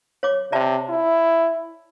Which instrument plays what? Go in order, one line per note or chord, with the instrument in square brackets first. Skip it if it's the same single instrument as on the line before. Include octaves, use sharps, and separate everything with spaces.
[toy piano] C#5 D6
[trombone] C3 [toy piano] D5 E5 A5
[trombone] E4